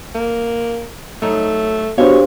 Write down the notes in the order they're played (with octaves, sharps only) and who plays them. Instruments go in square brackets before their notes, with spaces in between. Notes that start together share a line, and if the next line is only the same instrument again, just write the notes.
[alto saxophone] A#3
[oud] F#3 D#4 [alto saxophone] A3
[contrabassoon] B2 [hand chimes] D4 C5 F5 [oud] G4 [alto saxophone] C#5